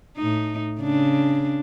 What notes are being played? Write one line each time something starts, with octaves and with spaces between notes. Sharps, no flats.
A2 D#4
C#3 D4